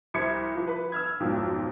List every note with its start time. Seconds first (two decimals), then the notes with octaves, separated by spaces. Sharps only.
0.14 C2 C5 B5 D6 G#6 C#7
0.56 F3
0.68 B4 B5
0.92 E6 F6 G#6
1.20 B1 F2 G#2 B2